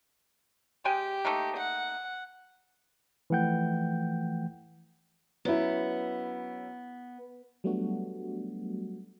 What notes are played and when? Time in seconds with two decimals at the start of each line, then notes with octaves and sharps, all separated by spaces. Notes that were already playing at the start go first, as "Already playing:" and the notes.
0.85 G#3 G4 G5 G#5
1.25 A3 A#3 D#4
1.56 F#5
3.30 E3 F3 A3 F#5 G5 G6
5.45 F#3 B3 C#4 E4
7.64 F#3 G3 A3 B3 D4 F#4